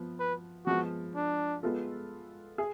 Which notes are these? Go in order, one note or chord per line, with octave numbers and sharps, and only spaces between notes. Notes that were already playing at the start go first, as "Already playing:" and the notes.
Already playing: F3 B3
B4
F3 G#3 B3 F#4
D4
G#3 B3 F4 A4
G#4